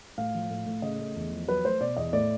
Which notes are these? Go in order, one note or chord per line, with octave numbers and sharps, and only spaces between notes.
A2 F5
F3
A2
A2
C#3 D#5
A3
E2
F3
F#3 B4
A3 C5
B2 D5
E2 D#5
A2 D5